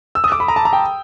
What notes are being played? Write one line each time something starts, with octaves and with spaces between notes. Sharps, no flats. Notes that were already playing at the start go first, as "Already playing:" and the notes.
E6
D#6
D6
B5
A#5
A5
A#5
G5